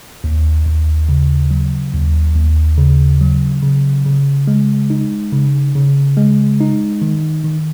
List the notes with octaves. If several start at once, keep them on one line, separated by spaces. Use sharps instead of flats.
D#2
D#2
C#3
F#3
D#2
D#2
C#3
F#3
C#3
C#3
G#3
D#4
C#3
C#3
G#3
D#4
D#3
D#3